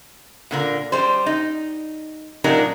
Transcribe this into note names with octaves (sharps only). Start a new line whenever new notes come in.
A#2 D3 A#4
G3 C5
D#4
A#2 F#3 D4 D#4 G4 A#4